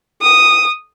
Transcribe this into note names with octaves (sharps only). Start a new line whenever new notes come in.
D#6